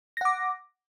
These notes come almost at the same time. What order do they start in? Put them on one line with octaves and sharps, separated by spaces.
A#6 F#5 D6